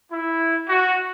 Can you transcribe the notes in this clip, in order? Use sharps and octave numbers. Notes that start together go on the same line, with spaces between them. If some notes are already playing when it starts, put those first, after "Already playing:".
E4
F#4